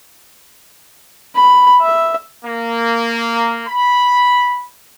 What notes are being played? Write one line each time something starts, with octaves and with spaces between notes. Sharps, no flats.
B5
E5
A#3
B5